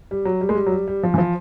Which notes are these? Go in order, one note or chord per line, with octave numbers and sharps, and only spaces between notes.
G3
F#3
G3
G#3
G3
F#3
G3
G3
F3
E3
F3